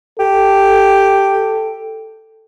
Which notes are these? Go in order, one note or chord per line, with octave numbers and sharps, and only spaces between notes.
G4 A4